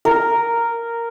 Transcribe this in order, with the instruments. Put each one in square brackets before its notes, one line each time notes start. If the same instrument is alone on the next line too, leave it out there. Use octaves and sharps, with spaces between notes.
[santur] A#4